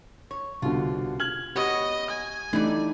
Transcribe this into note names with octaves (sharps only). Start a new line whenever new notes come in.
C#5
C2 B2 D3 F4
F6 G#6 F#7
B3 F#4 G4 C#5 D#5
G#5
E3 G3 A3 D4 D#4 D5